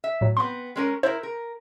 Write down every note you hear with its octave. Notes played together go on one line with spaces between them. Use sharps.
E5
A2 F#3
B3 C4 C6
G#3 C#4 A#4
E4 A#4 C5
A#4